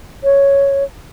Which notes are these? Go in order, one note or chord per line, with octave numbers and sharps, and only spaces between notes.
C#5